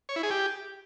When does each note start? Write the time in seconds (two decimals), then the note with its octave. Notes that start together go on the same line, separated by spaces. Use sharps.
0.09 C#5
0.16 E4
0.23 G#4
0.30 G4